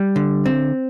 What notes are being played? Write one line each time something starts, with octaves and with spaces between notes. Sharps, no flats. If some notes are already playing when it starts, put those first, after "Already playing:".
Already playing: G3
D3
C4